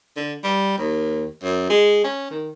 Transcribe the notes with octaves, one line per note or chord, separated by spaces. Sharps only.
D3
G3
D#2
F#2
G#3
C#4
D#3